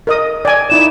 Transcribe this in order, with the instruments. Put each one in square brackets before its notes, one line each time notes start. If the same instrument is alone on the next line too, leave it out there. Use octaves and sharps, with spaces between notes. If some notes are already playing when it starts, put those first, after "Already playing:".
[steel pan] A#4 D#5 D#6
D5 G#5
[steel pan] D#4 E4 D5 [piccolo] E7